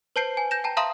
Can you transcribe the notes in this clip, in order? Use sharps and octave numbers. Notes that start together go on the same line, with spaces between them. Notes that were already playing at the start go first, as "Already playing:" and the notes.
B4 C5 A5 G6 C7 D7
G#5
G6 A#6 E7
G5 A5 A#5
E5 F5 A5 A#5 C6 D#6